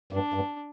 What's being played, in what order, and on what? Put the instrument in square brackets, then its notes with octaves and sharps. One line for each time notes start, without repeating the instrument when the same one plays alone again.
[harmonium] G2 [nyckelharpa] D4
[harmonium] G2